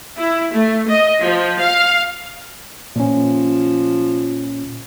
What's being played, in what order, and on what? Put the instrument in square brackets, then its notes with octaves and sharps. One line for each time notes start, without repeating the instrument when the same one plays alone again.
[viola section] E4
A3
D#5
F3
F5
[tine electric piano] A#2 C#4 [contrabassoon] F3